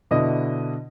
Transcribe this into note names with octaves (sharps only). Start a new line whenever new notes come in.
B2 D3 D4 E4 D#5